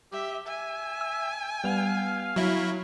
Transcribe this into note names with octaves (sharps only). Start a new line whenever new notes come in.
G4 E5
E5 G#5
E6
G3 B3 F5 F6
F#3 E4